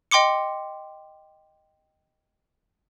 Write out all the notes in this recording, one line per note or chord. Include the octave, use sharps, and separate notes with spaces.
D#5 G5 C6 D6 C#7